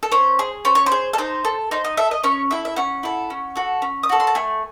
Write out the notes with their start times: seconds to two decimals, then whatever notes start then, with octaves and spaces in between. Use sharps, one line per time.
0.03 A4
0.12 C#4 C5
0.39 G#4
0.65 C#4 C5
0.75 C#5
0.86 C5
0.92 G#4
1.13 A4
1.18 D#4 C5
1.45 A4
1.71 D#4 C5
1.84 D#5
1.97 A4 E5
2.11 D#5
2.23 C#4 C#5
2.51 E4 A4 E5
2.65 E5
2.76 C#4 F#5
3.03 E4 A4
3.30 C#4
3.56 F#4 A4
3.82 C#4
4.03 D#6
4.09 F#4 A4 C#6
4.20 C6
4.27 A5
4.35 A3 G#5